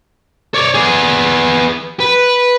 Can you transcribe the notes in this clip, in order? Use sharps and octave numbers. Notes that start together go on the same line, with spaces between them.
C#5 D5
B3 G#4
B4